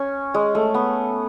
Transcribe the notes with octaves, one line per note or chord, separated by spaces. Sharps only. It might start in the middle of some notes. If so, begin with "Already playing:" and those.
Already playing: C#4
G#3
A3
B3